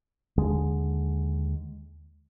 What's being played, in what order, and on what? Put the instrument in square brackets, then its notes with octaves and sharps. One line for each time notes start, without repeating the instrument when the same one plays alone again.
[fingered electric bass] D#2 D3 G#3